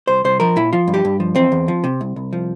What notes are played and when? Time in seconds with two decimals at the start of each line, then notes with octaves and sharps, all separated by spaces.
0.07 C2 C5
0.25 C2 C5
0.40 F3 A#4
0.56 A#2 E4
0.73 F3 F4
0.88 G2
0.94 G4
1.05 G2
1.20 F3
1.36 E2 C4
1.52 E2
1.68 F3
1.84 C3
2.01 C2
2.16 C2
2.33 F3